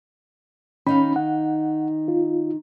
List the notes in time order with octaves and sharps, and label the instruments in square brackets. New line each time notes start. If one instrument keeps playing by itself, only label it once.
[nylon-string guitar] D#3 D#4 F5 [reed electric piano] C#4 B5
[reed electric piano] F#5
F4